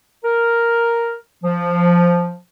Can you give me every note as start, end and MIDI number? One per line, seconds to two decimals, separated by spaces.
0.24 1.16 70
1.44 2.36 53